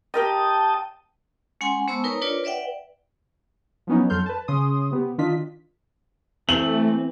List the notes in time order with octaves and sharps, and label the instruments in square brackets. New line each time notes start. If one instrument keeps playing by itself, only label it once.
[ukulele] G4 A#4 D#5 [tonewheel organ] G5 A5 D#6
[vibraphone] G#3 C#4 F#5 G#5 C6
G#3 B3 C5 A5 C#6 E6
D#4 A#4 B4 C#5 A#5
D4 F4 A#4 B4 C#5 D5
B4 D5 E5 F#5 G5
[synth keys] F3 F#3 B3 C#4 D#4
F2 F#3 A4 C6 F6 G6
B4 A5
C#3 C#4 C6 D#6
C3 B3 G4
D#3 D4 F4 D#5 B6
[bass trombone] E3 [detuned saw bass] A3 [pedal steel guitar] C4 [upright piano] F#7